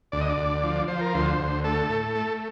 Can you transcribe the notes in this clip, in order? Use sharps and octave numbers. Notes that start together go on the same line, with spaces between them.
D2 D5
D#5
D5
D2
F3
F3 C5
A#4
D2 C5
D2
A3 A4
A2
A3